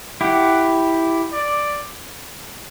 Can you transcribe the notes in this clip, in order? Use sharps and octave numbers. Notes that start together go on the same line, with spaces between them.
E4 G4 F#5
D5